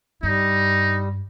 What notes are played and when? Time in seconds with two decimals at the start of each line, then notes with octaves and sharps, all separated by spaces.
0.23 G2 G3 D#4